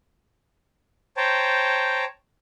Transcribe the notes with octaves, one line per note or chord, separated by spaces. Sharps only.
C5 C#5 G5 A5 A#5